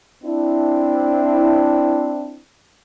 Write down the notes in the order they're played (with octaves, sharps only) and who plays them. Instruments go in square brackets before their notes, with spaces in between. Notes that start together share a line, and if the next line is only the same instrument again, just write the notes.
[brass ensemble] C4 D4 E4